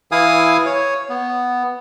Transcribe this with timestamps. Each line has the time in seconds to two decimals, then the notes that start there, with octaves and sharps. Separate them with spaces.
0.12 E3 E4 F5 G#5 D#6
0.66 C#5
1.10 B3